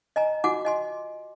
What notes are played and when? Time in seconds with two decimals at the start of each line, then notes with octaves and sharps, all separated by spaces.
0.16 D#5 G#5 A#5
0.44 F4 F#4 F#5 G#5 D6
0.65 D#5 G#5 C6